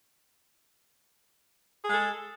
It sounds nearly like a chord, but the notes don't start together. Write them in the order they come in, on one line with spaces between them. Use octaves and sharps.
G#4 G#3 A4